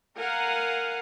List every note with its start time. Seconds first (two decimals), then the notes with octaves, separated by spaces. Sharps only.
0.18 A#4 F5 F#5 G#5